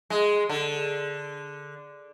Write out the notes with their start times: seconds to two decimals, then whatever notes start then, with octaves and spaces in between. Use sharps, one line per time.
0.10 G#3
0.49 D3